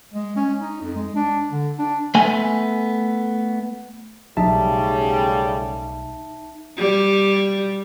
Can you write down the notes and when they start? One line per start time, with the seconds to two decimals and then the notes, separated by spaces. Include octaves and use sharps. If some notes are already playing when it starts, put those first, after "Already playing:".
0.14 G#3
0.36 C#4
0.59 D#4
0.81 F2
0.96 G#3
1.15 D4
1.52 D3
1.79 D4
2.15 A3 B3 G#5
4.37 B1 C#3 G3 A3 D#4 E5 A5
6.77 G3